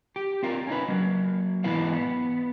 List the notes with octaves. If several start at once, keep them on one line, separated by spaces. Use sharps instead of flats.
G4
C4 F4 A#4
C#4 D#4 B4
F#3 A#3
G#2 E3 B3 E4 B4 F5
B3